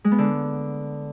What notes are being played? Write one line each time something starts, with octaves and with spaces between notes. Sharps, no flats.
G#3
B3
D3